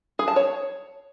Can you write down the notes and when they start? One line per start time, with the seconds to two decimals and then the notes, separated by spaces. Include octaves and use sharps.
0.19 G#4
0.28 A5
0.36 C#5